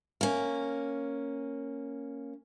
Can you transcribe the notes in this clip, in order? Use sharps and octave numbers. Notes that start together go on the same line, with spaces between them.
A#3 C#4